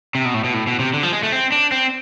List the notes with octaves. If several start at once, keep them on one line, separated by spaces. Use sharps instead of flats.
C3
B2
A2
B2
A2
B2
C3
D3
F3
G#3
A3
C4
D4
C4